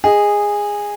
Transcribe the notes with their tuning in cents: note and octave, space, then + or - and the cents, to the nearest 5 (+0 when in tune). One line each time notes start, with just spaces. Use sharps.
G#4 -15 D#5 +0